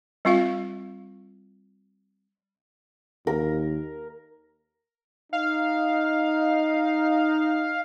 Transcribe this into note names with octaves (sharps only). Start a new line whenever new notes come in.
G3 C4 F4 E5 F5
D#2 A#4
D#4 F5